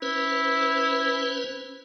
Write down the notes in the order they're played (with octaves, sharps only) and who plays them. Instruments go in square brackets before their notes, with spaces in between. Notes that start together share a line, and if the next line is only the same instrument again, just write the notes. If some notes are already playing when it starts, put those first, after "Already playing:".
[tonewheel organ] C#4 B4 C5 [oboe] E4